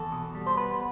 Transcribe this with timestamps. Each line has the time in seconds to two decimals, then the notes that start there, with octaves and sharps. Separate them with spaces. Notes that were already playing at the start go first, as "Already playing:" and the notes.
Already playing: E2 A4
0.12 B2
0.35 G3
0.47 C5
0.57 B3 B4